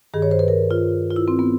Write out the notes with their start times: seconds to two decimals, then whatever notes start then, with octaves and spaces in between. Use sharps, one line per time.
0.14 G2 D#3 G#4
0.22 C#5
0.31 C5
0.39 B4
0.48 A#4
0.71 F4
1.11 F4
1.16 E4
1.28 C4
1.39 B3